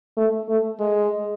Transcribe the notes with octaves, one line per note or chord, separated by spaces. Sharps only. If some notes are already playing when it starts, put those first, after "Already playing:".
A3
A3
G#3